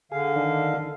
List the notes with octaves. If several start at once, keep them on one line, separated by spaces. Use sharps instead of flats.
D3 G#4 F5
D#3 D4